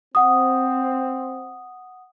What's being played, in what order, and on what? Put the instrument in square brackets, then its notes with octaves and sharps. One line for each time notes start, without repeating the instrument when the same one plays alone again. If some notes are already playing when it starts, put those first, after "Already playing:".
[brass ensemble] C4 [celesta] F#5 D#6